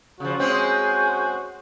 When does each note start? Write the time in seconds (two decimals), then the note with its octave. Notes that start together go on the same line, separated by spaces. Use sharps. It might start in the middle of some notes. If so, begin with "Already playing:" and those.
0.20 C#3 F3 F#4
0.39 G#3 C4 C#4 G#4 G#5 G6